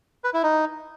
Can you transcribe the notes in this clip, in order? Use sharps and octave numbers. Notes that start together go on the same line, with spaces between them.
B4
E4
D#4